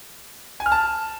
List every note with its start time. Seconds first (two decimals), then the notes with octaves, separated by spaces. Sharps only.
0.60 G#5
0.66 F6
0.72 A5